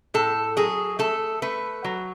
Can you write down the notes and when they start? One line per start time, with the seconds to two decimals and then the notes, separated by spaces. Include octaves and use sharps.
0.14 A2 A4
0.57 F#3 G#4
0.99 A3 A4
1.42 A3 B4
1.84 F#3